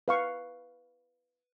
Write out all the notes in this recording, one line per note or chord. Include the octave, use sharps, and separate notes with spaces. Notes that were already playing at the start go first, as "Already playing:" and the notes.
B4 F5 C#6